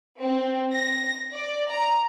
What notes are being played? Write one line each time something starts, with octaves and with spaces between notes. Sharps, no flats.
C4
A#6
D5
A#5